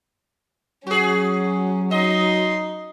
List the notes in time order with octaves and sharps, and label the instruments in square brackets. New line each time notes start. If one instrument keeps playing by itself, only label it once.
[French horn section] F#3 [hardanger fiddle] C#4 [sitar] F#4 G#4
[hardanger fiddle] D#4 C6 [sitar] D#5